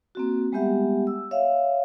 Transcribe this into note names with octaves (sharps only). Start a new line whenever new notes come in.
A#3 C4 F#4
G3 G#3 B3 G4 E5 F#5
E6
C#5 E5 F5